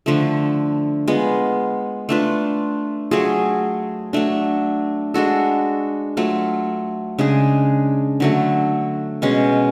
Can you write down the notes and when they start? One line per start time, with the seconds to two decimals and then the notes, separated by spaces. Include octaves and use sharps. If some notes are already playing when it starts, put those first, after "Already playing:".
0.06 D3 F3 A3
1.08 G#3 B3 F4
2.09 A3 D4 F4 B4
3.11 F#3 A3 F4 G#4
4.13 F#3 A3 D4
5.14 G#3 D4 F#4 A4
6.17 F#3 A3 F4
7.18 C#3 G#3 D4 G#4
8.20 D3 F#3 A3
9.22 B2 G#3 C#4